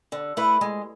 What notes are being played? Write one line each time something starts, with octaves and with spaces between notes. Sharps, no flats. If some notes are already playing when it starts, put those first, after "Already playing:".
D3
A3 E4 B4
G#3